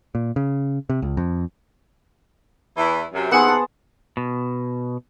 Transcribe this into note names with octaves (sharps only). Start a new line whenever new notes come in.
A#2
C#3
C3
C#2
F2
E2 E3 E4
F#2 C3
D#2 B3 G#4 C5 E5 F#5
A5
B2